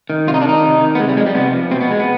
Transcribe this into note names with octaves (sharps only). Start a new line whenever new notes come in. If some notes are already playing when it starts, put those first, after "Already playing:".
D#3
C3 F4
D#4
D4
D#3 D#4
C3
D#3
B3
C3 G#3
G3
F3 G#3
G3
C3 B3
F3
B2 C4
B3
G#3
B3